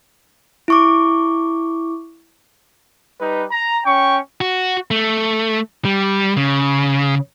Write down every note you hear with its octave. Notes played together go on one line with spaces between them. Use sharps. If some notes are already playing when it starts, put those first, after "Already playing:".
E4 C#6 D6
G3 D#4 B4
A#5
C#4 C#5 G5 C#6
F#4
A3
G3
C#3